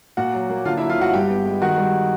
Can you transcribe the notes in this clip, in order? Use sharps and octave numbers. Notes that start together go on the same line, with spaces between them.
A#2 F#4 F#5
F#3
A#3
D3 F4 F5
E4 E5
F#3
F4 F5
G1 F#4 F#5
G2 G4 G5
B3
G#3
D#3 F#4 F#5
G3